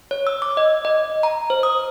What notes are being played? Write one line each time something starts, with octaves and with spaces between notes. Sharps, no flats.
C#5
E6
D6
D#5
D#5
A#5
C5
D#6